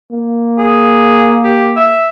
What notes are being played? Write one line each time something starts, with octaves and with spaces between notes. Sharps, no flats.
A#3
G#4
G4
E5